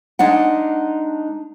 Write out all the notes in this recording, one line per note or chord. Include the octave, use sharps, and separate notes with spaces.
G#3 D4 D#4 F#5